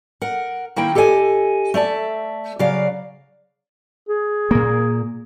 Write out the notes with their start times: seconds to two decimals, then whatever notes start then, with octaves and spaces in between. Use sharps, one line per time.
0.21 A#4 F#5
0.76 D#3 A#3 E4 G5
0.95 G4 A4 D#5 F5 G#5
1.74 A3 D5 E5 A5
2.59 C#3 F#3 D5 F5
4.09 G#4
4.51 A#2 A#3